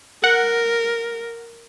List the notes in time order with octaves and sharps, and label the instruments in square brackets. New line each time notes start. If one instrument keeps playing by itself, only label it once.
[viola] A#4 [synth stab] F#5